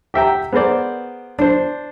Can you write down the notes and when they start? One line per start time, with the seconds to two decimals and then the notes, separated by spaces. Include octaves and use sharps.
0.14 G4 E5 G5 A#5
0.53 B3 G#4 A#4 C5 D5
1.39 D4 C5